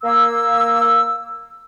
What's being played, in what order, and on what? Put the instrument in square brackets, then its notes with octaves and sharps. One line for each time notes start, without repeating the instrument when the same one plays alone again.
[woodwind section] A#3 E6